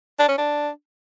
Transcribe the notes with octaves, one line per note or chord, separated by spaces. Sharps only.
D4
C#4
D4